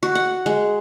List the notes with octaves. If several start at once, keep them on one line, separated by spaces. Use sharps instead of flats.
F#4
F#5
G#3